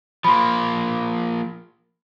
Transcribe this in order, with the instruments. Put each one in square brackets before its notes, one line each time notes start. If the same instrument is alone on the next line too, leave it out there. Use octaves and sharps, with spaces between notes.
[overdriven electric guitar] F3 A#3 [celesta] B5 C6